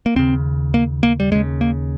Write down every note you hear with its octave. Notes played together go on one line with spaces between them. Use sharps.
A#3
D#2 C#3 C4
A#3
A#3
G3
D#2 C#3 G#3
A#3